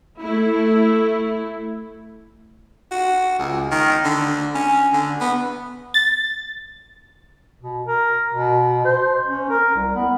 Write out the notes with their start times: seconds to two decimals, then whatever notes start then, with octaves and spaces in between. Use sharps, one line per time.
0.20 A3 E4
2.91 F#4
3.39 C#2
3.71 D#3
4.04 D3
4.55 C#4
4.93 D3
5.21 B3
5.94 A6
7.61 B2
7.86 A#4
8.34 B2
8.85 C5
9.27 C#4
9.50 A#4
9.75 C2
9.95 B3